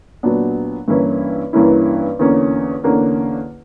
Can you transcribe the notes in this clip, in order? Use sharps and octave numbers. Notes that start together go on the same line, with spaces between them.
A#2 F#3 B3 D4
G2 E3 A#3 C#4 E4
G2 E3 A#3 C#4 E4
E2 D3 A#3 C#4
E2 D3 A#3 C#4